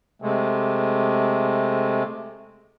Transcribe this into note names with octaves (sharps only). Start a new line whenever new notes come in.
C3 G#3 A3